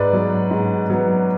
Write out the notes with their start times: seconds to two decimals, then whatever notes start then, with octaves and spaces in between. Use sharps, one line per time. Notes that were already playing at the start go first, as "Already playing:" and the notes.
Already playing: G#2 B4 D5
0.13 F#3 B3
0.51 G#2
0.90 F#3 B3